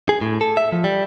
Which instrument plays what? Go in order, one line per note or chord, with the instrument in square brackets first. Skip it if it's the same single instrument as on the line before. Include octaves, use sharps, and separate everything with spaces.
[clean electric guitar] G#4
A2
A4
E5
F3
G3